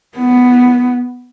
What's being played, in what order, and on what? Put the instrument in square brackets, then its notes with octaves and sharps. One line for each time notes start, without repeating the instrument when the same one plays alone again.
[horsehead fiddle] B3